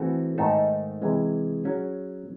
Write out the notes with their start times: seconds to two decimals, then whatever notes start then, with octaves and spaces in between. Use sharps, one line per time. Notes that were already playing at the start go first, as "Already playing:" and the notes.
Already playing: E3 A3 C4 F#4 A4
0.38 G#2 D#3 A3 D#4 A4
1.02 C3 E3 G#3
1.64 F#3 C#4 G#4